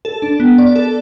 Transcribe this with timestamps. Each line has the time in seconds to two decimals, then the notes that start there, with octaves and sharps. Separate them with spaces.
0.05 A4
0.22 D4
0.40 B3
0.58 D5
0.76 A4